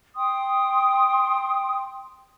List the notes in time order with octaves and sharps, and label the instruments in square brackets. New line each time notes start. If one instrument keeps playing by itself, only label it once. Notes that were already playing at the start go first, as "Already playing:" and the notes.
[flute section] G5 C6 D#6